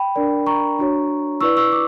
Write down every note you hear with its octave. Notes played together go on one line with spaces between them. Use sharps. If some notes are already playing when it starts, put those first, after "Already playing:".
Already playing: G5 B5
D4 A#4 D5
A#5 C#6
D4 F#4 C#5
E4 B4 D5 C#6 E6
C#6 E6
D6